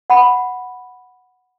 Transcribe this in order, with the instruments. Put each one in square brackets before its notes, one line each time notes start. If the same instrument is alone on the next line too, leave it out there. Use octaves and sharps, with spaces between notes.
[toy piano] F#5 B5